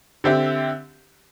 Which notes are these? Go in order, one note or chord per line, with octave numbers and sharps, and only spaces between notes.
D3 C4 G4 E5